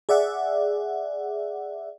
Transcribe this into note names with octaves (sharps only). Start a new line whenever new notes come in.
G#4 D5 E5 F#5